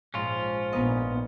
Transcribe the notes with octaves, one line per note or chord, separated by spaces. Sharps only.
A#1 G#2 C#4 F4
A#1 B3 D#4 B4 D#5